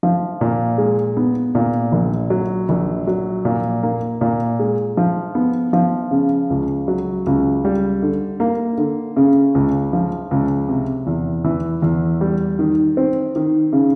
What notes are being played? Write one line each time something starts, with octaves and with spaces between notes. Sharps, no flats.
F3
A#2
G#3
B3
A#2
A#1
F#3
A#1
F#3
A#2
A#3
A#2
G#3
F3
B3
F3
C#3
C#2
F#3
C#2
G3
D3
A#3
D3
C#3
C#2
F3
C#2
C3
E2
E3
E2
G3
D#3
C4
D#3
C#3